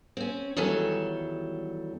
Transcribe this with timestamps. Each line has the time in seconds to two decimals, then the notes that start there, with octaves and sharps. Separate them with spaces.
0.17 C4 C#4
0.57 E2 D#3 F#3 G3 A4 G#5